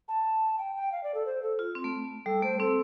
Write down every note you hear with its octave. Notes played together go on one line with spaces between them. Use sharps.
A5
G5
G5
F5
D5
A4
C5
A4
F4
C4
A3
G3 A4
A3 C5
C4 A4